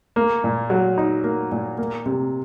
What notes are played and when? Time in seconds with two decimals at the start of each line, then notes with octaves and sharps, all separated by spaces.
0.16 A#3
0.44 A#2
0.70 F#3
0.98 D#4
1.24 A#3
1.52 A#2
1.78 A#3
2.06 C3